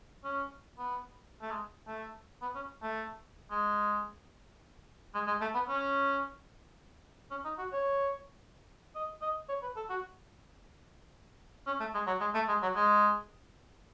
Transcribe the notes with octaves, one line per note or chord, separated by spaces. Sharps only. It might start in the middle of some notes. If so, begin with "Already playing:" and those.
C#4
B3
A3
G#3
A3
B3
C#4
A3
G#3
G#3
G#3
A3
B3
C#4
C#4
D#4
F#4
C#5
D#5
D#5
C#5
B4
A4
F#4
C#4
A3
G#3
F#3
G#3
A3
G#3
F#3
G#3